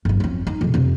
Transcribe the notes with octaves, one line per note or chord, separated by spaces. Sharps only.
G1 F#2
F2 C#4
D#4
F2 C3
F2 C3